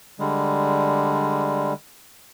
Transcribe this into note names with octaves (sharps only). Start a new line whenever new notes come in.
D3 G3 G#3